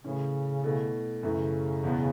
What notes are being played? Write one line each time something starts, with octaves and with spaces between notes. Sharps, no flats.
A2 C#3 E3 C#4
B2 A3 E4
F#2 C#3 E3 A3
E2 B2 B3